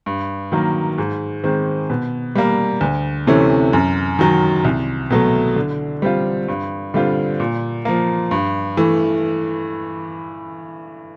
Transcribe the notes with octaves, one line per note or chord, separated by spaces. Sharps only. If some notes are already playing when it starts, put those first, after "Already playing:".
G2
D#3 F#3 A#3
G#2
D#3 G#3 C4
B2
G3 A#3
D2
C3 E3 A3 C#4
F#2
D#3 F#3
C2
B2 F#3 A3
D3
G3 C4 F4
G2
D3 G3 C4 F4
A#2
F3 A#3
G2
E3 A3